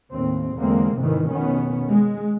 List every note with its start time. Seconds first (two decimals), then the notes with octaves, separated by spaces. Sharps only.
0.10 D#2 A2 C4
0.57 E2 D3 G#3 A#3 C4
0.97 F1 G#2 C3 D#3 E3
1.29 F1 B2 D#3 B3 C#4
1.88 G#3